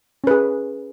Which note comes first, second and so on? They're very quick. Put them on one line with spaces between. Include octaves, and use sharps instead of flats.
C#4 B4 G#4